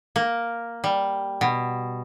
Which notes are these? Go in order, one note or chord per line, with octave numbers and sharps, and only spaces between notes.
A#3
G3
B2